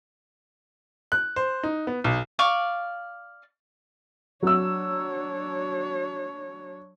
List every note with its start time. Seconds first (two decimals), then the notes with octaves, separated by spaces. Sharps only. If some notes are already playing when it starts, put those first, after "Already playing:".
1.12 F#6
1.36 C5
1.63 D#4
1.87 B3
2.04 B1
2.39 D5 F5 C#6
4.43 F#3 D4 C#5 E6